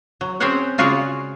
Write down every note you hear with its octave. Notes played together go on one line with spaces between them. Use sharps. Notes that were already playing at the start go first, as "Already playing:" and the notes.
F#3
C4 C#4 G#4 C5 C#5 F#5
C#3 F4 F#4 G#4 C#5 D5